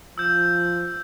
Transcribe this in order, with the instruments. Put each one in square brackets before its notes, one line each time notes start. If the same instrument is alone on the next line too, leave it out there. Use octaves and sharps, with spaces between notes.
[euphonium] F3 [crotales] E6 G6